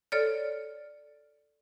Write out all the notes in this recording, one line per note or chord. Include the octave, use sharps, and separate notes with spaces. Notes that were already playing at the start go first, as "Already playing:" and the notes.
A4 C#5 D5 F6